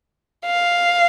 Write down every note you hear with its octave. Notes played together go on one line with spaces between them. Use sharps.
F5